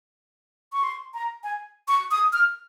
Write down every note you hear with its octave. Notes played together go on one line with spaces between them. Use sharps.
C#6
C6
A#5
G#5
C#6
D#6
F6